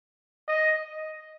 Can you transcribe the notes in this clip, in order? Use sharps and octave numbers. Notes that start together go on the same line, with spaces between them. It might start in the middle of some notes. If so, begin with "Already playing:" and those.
D#5